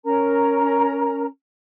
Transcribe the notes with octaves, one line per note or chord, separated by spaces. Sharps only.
C#4 A#4 A#5